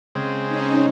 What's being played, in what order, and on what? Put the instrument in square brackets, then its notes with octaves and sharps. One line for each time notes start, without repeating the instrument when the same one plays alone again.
[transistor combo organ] C#3 G#3 C4
[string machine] C#4 D#4